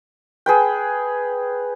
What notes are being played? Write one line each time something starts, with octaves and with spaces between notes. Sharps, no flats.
G#4 B4 G5